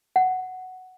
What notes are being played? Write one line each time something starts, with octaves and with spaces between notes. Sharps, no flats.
F#5